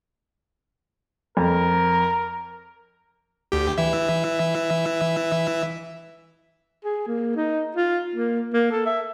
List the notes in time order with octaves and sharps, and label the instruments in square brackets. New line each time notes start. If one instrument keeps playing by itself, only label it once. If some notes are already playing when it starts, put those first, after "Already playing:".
[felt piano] F2 [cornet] A#4
[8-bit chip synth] D2 G4
E3 E5
[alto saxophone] G#4
A#3
D#4
F4
A#3
A#3
A4
E5